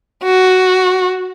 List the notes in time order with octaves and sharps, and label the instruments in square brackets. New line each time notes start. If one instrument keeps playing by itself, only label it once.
[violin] F#4